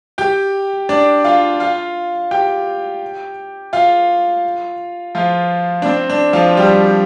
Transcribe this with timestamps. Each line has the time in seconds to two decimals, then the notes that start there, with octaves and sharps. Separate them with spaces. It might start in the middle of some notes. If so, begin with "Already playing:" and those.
0.18 G4 G5
0.89 D4 D5
1.25 F4 F5
1.60 F4 F5
2.31 G4 G5
3.73 F4 F5
5.15 F3 F4
5.82 D4
5.86 C4
6.10 D4
6.33 F3 F4
6.57 G3 G4